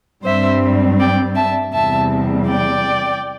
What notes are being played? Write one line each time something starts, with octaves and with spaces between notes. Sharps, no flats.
G2 G3 C4 C5 E5
D5 G5
E5 A5
E2 C3 G3 E5 A5
D5 G5